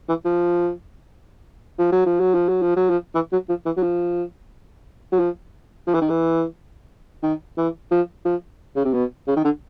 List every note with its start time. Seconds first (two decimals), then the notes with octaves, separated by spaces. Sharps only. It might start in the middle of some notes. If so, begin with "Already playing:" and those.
0.09 E3
0.25 F3
1.79 F3
1.92 F#3
2.06 F3
2.20 F#3
2.35 F3
2.49 F#3
2.62 F3
2.76 F#3
2.90 F3
3.15 E3
3.33 F#3
3.49 F3
3.66 E3
3.77 F#3
3.83 F3
5.12 F#3
5.20 F3
5.87 F3
5.94 E3
6.02 D#3
6.10 E3
7.23 D#3
7.58 E3
7.91 F3
8.25 F3
8.76 C#3
8.85 C3
8.94 B2
9.28 C#3
9.37 D#3
9.45 D3